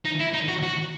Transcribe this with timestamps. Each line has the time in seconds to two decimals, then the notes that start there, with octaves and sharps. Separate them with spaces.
0.05 D#4
0.20 E4
0.34 D#4
0.48 F#4
0.63 F#4